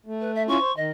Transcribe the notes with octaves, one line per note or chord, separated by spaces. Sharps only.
A3
B4
E5
C#4 E4 F4 C#6
C5
D#3 D#5